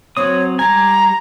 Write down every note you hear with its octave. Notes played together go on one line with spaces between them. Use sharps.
F#3 C4 C#5 D#6
G3 G#5 A#5